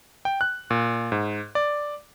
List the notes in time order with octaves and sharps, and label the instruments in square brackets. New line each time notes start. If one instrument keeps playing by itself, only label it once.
[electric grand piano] G5
F#6
A#2
G#2
D5